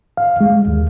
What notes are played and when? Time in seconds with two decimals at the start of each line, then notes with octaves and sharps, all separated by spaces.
0.17 F5
0.41 G#3
0.67 D#2